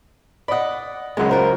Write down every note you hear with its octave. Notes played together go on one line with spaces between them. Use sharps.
D5 D#5 F#5 B5
C#2 F#2 F#3 G#3 F#5
F4 A#4 C5